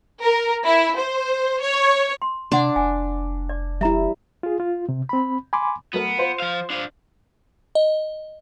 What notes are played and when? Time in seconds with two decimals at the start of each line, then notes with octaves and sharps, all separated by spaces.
0.23 A#4
0.65 E4
0.97 C5
1.61 C#5
2.22 C6
2.52 C3 D4 D5 F#5 C6
2.76 F1 G#5
3.49 D5
3.81 G3 E4 E5 A#5
4.43 F4 G#4
4.60 F4
4.89 C3
5.09 C4 B5
5.53 G#5 B5 C6 D6
5.93 F#3 A3 B3 A#4
6.17 F4 C5
6.40 F3 F5
6.70 D4 F5
7.75 D#5